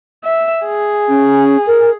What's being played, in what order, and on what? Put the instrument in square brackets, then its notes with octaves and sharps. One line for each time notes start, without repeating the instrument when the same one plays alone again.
[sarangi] E5
G#4
[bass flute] C#4
A#4